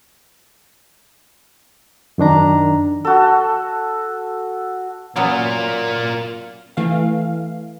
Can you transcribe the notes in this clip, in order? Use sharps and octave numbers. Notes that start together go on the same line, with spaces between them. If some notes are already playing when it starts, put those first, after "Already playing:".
F#2 D#3 D4 A#5
F#4 A4
A#2 F#3 A#3 B3 C#4 F4
E3 A3 F5